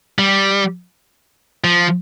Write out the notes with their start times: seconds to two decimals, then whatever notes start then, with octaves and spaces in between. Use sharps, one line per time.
0.19 G3
1.64 F3